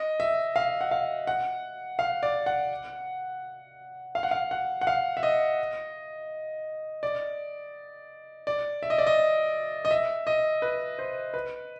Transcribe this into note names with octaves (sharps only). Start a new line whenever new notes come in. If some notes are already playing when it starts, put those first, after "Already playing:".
Already playing: D#5
E5
F5
F#5
F5
F#5
F5
D5
F#5
F5
F#5
F5
F#5
F#5
F5
E5
D#5
D5
D5
E5
D#5
D5
D#5
D#5
E5
D#5
B4
C5
B4